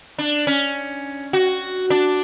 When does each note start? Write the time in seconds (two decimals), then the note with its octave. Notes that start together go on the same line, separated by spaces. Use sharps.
0.18 D4
0.47 C#4
1.33 F#4
1.90 D4